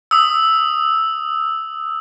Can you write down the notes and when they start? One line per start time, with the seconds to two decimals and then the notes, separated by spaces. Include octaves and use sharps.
0.11 D#6 E6